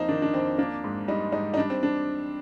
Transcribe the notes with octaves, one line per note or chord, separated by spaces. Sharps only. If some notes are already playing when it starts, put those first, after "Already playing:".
Already playing: F2 A#3 D#4 C5
D#3 D4
D4
F2 C4
A#3 D4
G#2
G3 D#4
G#2 D#4
D#4
G3 D4
C4
D4